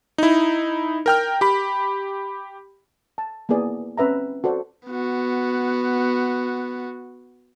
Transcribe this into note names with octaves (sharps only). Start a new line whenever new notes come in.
D#4 E4
A#4 G5 F6
G4 B5
A5
A#3 B3 E4 G#4 D5
C4 C#4 B4 E5 A#5
F#4 A4 C5 D5
B3 F#4